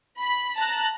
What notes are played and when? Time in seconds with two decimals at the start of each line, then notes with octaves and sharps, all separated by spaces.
0.19 B5
0.56 A5 A#5 F#6